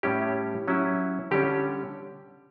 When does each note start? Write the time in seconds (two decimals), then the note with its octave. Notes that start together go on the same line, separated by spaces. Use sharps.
0.03 A2 G3 C#4 E4 G4
0.68 F#3 C#4 E4
1.31 D3 G3 C#4 G4